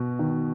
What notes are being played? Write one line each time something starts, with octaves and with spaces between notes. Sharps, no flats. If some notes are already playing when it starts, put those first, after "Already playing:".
Already playing: B2
D#3